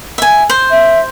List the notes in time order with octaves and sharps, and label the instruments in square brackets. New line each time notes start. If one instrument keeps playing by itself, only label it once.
[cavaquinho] E5 G#5
C5
[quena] E5